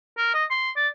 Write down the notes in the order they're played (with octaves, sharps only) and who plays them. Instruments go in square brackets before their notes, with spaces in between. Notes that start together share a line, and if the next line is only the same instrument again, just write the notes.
[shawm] A#4
D#5
C6
D5